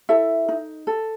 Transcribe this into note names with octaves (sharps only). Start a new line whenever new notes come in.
E4 A4 E5
D#4
A4